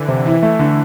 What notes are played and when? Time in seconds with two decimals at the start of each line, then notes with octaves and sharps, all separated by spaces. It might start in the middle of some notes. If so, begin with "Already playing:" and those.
Already playing: D3 E3
0.08 C3
0.25 E3 E4
0.43 A3
0.59 D3